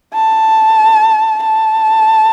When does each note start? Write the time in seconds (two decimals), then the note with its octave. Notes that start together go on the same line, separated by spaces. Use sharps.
0.14 A5
1.43 A5